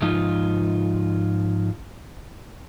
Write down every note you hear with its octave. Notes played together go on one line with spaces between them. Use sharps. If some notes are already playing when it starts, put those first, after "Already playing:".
G#2 F3 D#4 F4